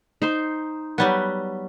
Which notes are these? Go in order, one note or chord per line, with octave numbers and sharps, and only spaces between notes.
D#4 C5 C6
F#3 G3 B3